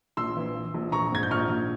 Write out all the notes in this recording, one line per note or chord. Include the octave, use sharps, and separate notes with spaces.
A#1 C6 E6
E3
E3
A#1
A#1 A#5 C#6
G#2 G#6
G6
A#1 C#6 F6
A#1